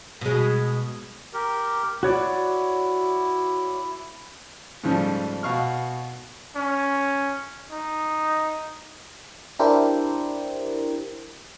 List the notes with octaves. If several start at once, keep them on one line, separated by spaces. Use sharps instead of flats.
B2 G#3
G4 A#4
E4 F#4 C#5 D5
G#2 C#3 F3 G3 A3
B2 F5 C#6 F6
C#4
D#4
D4 E4 G4 A#4 C5